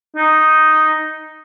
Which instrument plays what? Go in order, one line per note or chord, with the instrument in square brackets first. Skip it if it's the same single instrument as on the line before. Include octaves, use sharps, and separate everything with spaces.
[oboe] D#4